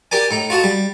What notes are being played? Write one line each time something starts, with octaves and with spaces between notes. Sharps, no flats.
G4 A#4 D5 G#5
A2 D#4 A#5
F4 F#4 D#5 A5
G3